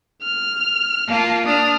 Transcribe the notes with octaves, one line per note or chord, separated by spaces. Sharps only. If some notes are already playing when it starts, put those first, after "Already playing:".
F6
A#3 F4 F5 A5
D4 D#6 F6